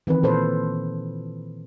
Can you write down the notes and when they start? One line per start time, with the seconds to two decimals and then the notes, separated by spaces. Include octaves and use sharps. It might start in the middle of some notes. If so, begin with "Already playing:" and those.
0.07 D#3 E3 C4 B4
0.23 A#2 A4 B4 C5